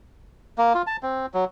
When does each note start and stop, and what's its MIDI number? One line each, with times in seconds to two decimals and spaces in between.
0.58 0.73 58
0.75 0.82 65
0.87 0.97 81
1.03 1.26 60
1.34 1.45 54